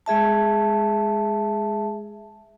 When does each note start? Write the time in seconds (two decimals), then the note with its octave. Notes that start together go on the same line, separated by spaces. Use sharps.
0.06 G#3 G#4 E5 A5